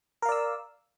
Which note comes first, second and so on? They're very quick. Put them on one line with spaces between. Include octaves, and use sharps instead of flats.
A#4 F5 D5 E6